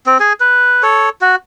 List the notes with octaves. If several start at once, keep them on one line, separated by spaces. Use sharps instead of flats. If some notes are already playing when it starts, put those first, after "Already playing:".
C4
G#4 G#5
B4
A4 C#5
F#4